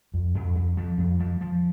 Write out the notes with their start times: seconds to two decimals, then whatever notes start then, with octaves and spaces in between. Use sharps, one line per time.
0.14 F2
0.35 F2
0.55 F2
0.77 F3
0.98 F2
1.20 F3
1.41 F3